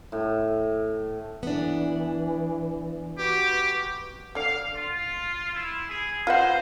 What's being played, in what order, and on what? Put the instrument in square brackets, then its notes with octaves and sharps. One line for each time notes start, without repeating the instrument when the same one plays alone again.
[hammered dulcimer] A2
[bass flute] E3 [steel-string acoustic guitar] B3 D4
[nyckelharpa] F#4 B4 [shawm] G4
[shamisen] D3 D5 [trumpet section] F5
[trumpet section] F4
E4
G#4
[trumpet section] D#4 C5 [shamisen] F4 B4 F#5